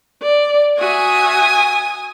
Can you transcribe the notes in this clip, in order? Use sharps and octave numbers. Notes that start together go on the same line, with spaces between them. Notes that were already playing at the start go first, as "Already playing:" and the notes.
D5
F#4 E5 G#5 D#6